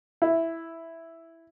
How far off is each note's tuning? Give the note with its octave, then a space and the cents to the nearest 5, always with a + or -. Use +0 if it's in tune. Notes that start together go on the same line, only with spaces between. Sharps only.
E4 +0